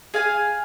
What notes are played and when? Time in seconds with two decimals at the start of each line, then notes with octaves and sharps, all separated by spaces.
0.14 G#4 F5 G#5